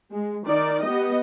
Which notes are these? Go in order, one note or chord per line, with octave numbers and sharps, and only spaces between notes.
G#3
D#3 D#4 D5
B3 G4 D#5